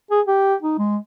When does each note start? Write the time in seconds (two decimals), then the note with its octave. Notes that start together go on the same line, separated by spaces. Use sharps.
0.11 G#4
0.27 G4
0.62 D#4
0.78 G#3